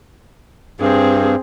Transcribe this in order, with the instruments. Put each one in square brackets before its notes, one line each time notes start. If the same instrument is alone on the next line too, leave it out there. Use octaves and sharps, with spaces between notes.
[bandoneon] G2 [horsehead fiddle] C4 G#4